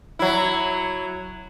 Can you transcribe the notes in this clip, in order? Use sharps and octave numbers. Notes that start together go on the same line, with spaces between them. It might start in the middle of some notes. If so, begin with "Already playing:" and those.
F#3 E4